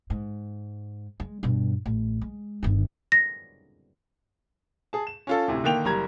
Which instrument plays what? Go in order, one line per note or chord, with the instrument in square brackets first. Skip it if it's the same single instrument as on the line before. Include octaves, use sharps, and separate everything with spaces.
[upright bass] G#2
G#3
G2 B2
A1
G#3
G1 D#3
[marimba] A#6
[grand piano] G#4 A5
E7
C#4 F4 A4
D2 A2 C3
D3 D#3 A#3 G5 F7
F#1 G3 A#5 G#6